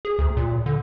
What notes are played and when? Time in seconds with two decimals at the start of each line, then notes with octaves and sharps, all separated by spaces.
0.05 G#4
0.19 D2
0.37 A#2
0.66 D3